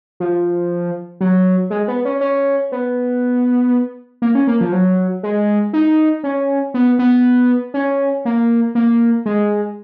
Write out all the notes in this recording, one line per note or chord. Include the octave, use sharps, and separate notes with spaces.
F3
F#3
G#3
B3
C#4
C#4
B3
A#3
C#4
A#3
F3
F#3
G#3
D#4
C#4
B3
B3
C#4
A#3
A#3
G#3